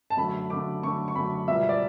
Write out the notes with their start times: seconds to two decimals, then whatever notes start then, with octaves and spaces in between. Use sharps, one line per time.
0.10 A5
0.17 F#2 D3 A3 B5
0.50 F#2 D3 A3 D6
0.83 F#2 D3 A3 C#6
1.08 C#6
1.15 F#2 D3 A3 B5
1.48 C#2 B2 G3 E5
1.69 D5